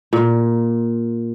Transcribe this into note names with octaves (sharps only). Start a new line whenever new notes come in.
A#2